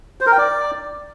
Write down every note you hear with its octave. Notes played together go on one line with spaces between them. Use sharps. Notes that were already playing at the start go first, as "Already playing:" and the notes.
C5
A#4
G5
D5